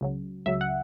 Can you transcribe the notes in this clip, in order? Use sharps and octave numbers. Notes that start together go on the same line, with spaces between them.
C#2 C#3 F#3
C#2 C#3 F#3 E5
F#5